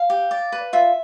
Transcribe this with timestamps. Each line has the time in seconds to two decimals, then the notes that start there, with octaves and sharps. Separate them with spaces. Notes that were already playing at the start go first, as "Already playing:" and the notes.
Already playing: F5
0.10 G4
0.31 D5
0.52 B4
0.73 F4 E5